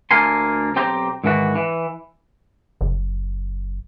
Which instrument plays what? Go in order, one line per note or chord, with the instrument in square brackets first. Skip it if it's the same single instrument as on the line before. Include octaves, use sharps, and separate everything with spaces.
[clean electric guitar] D2 A#3 A4 A#4 G#5 C6
B1 C4 G4 C5 G5 A#5
G#2 D#3 E3 F#4
E3
[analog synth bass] F#1